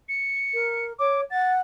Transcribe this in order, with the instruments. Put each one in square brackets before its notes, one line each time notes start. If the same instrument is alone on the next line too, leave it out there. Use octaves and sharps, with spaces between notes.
[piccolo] C#7
[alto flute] A#4
[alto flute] C#5 [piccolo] D6
[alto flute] F#5 [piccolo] A6